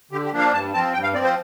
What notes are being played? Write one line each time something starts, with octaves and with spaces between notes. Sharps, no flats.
D3 G4
G4
F3 A#3 D4
F5
G2 A5
F3 C4 A5
G2 G5
F5
F3 C4 D5
C5